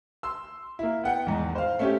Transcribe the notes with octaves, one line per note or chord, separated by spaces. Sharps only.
C6 E6
A#3 E4
B3 F#5 G5
E2 G#2 D#3
C5 F5
A3 C#4 G4